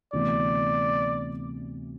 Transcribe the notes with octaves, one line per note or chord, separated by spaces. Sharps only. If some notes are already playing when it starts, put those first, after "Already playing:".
D2 C3 E3 B3 D5